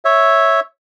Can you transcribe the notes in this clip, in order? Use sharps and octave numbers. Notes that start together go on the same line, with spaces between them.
C#5 E5